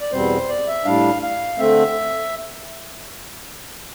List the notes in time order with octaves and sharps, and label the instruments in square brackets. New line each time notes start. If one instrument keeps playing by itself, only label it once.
[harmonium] D5
E2 B2 G3 C4 C5
D5
E5
A2 G3 D4 F5
F5
D3 A3 C4 E5